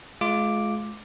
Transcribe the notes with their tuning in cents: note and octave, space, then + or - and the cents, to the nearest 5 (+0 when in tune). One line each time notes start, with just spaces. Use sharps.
G#3 +35 F4 +0 D6 +0